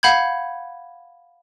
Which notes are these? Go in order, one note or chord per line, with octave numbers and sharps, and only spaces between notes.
F5 F#5 B5 G6 G#6